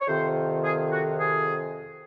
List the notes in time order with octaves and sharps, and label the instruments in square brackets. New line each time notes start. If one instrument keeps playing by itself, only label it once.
[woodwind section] C#5
F2 C3 D#3 C5
G#4
F#4
G#4